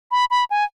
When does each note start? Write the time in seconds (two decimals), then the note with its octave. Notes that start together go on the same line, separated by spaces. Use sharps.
0.11 B5
0.31 B5
0.50 G#5